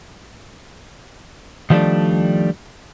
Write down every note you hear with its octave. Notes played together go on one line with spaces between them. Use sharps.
D#3 F3 G3 A3 D4